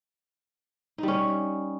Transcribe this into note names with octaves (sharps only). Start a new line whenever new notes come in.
G3 C#4 D#4